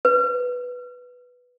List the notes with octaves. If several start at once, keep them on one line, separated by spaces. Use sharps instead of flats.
B4